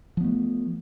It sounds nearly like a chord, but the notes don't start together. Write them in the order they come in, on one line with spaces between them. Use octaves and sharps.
F3 B3 A3